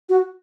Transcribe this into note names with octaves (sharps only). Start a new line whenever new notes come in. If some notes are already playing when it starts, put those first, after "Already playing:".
F#4